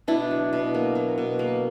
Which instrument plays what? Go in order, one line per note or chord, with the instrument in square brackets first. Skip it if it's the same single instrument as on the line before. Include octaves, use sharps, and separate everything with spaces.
[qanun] B2 D4 E4
F#3
B2
A#3
F#3
B2
A#3